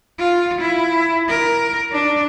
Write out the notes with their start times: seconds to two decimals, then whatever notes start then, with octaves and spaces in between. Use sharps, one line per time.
0.19 F4
0.61 E4
1.29 A#4
1.91 D4